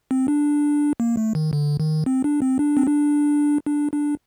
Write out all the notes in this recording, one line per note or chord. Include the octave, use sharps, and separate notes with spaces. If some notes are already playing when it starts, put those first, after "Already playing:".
C4
D4
A#3
A3
D#3
D3
D#3
C4
D4
C4
D4
C4
D4
D4
D4